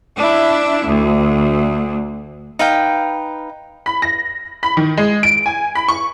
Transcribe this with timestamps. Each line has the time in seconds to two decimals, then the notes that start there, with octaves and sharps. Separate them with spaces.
0.16 D4 E4
0.86 D2
2.59 D#4 B4 F5 G5
3.86 B5
4.02 A#6
4.63 B5
4.77 D#3
4.97 G#3
5.23 D7
5.46 G#5
5.75 B5
5.88 C#6